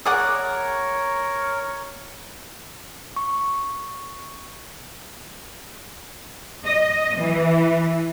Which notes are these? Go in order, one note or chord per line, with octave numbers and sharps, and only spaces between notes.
G#4 A#4 C#5 D5 F#5
C#6
D#5
E3